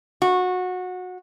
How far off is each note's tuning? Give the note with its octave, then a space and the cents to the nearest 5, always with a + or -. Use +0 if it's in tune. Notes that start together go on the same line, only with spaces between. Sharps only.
F#4 -20